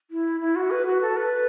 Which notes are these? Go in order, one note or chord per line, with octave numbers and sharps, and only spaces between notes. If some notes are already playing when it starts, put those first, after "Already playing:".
E4
E4
F#4
B4
F#4
A4
B4